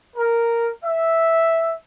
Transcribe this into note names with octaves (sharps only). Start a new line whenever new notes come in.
A#4
E5